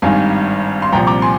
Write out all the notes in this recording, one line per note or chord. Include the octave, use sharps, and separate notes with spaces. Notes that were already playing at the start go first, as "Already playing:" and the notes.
G#1 G2 D#3 F5 G#5
C6
C2 A#2 F3 G5 A#5
A#5 D6
G#5 C6